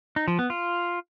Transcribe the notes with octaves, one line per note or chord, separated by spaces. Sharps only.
D#4
F3
B3
F4